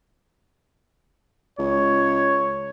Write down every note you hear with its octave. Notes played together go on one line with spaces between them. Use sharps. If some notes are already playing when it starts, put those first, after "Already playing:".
C#2 C#5